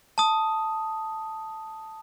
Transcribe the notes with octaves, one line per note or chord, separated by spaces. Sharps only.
A5 D#6